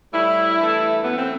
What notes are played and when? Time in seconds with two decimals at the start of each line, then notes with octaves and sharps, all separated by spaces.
0.12 A2 G3 E4
0.58 G2 E3 A3
1.02 F#2 E3 A3 B3
1.17 C4